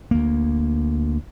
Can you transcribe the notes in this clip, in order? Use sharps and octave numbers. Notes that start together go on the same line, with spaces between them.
D2 A#3